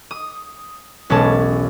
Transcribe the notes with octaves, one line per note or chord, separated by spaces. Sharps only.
D#6
E1 B1 G#3 C#4 A5